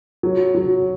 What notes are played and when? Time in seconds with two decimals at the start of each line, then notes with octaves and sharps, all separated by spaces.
0.23 F#3
0.55 F#3